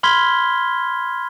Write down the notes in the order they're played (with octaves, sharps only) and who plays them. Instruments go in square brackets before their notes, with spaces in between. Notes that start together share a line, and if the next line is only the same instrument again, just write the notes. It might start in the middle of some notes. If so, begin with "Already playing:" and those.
[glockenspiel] B5 C6 F6 G#6 B6 G7